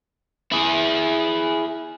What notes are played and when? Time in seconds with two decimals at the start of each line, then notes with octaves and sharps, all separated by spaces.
0.52 E4 G#4